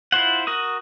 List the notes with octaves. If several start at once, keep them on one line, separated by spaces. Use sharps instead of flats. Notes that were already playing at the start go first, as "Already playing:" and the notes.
E4 F4 C5 F#5
F#4 A#4 D#6